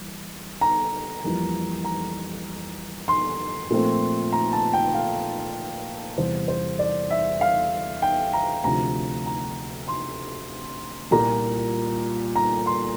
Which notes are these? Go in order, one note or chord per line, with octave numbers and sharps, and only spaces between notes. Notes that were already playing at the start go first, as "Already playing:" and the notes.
Already playing: E3 G3 A#3
A#5
F2 E3 G3 A#3
A#5
C6
A#2 F3 A3 C4
A#5
A5
G5
F5
E2 C3 G3 C5
C5
D5
E5
F5
G5
A#5
D2 C3 F3 A#5
A#5
C6
C2 A#2 G3 A#3 A#5
A#5
C6